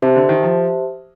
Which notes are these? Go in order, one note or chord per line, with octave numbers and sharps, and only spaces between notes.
C3 G4 C5 E5 A5
D3
D#3
F3